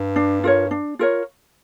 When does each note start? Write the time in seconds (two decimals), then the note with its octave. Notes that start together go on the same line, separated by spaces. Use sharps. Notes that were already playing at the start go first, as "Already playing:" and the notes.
Already playing: G2
0.16 D4
0.44 F4 A#4 C#5
0.71 D4
0.99 F4 A#4 C#5